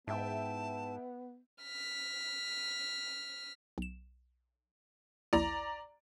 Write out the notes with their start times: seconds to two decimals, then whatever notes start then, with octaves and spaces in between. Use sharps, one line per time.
0.07 G#2 B3 E4 E5 G5 A5
1.63 F6 B6
3.78 B1 E7
5.33 A#1 D#2 E4 D5 A#5